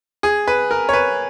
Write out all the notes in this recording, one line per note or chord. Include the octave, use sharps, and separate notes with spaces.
G#4
B4
A#4
C#5
B4